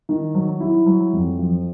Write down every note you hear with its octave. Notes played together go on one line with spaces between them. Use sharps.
D#3
F#3
E4
F#3
F2
F3